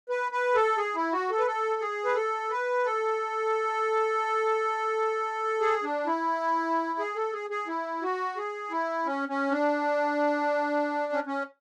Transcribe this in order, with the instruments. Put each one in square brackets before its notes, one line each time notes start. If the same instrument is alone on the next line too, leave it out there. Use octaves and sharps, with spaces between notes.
[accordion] B4
B4
A4
G#4
E4
F#4
A4
B4
A4
G#4
B4
A4
B4
A4
G#4
D4
E4
G#4
A4
G#4
G#4
E4
F#4
G#4
E4
C#4
C#4
D4
C#4
C#4